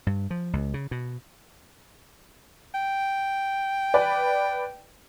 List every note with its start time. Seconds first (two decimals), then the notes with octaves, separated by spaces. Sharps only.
0.07 G2
0.31 F3
0.53 C#2
0.74 C#3
0.91 B2
2.74 G5
3.94 B4 D5